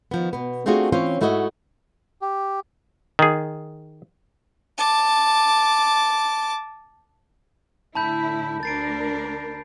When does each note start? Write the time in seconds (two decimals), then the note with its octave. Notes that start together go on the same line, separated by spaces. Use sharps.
0.11 D#3 F3 B3
0.33 B2 B3
0.66 A3 C4 D4 F4 F#4 G#4
0.92 E3 C4 C#4 F4 C5 C#5
1.21 G#2 A3 E4 F#4 C5 D#5
2.21 G4
3.19 D#3 G#4
4.78 A5 D6
7.95 A2 D3 E4 A5 B5 G6
8.63 D2 D4 A#4 A6 C7 D7